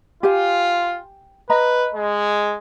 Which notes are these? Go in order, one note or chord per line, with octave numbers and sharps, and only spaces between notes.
F4 G4 G#5
B4 D#5 A#5 B5
G#3